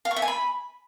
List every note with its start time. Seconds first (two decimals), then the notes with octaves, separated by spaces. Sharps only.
0.05 F5
0.11 C#6
0.16 E5
0.22 G#5
0.28 B5